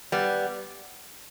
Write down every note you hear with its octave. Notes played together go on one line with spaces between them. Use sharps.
G3 B3